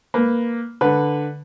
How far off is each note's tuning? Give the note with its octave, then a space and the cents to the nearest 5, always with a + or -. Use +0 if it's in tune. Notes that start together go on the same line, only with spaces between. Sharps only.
A#3 +0 B4 +0
D3 +0 B4 +0